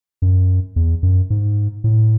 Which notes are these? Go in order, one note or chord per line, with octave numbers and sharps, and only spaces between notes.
F#2
E2
F#2
G#2
A2